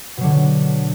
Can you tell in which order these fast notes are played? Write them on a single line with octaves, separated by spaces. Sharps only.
B2 F#3 D3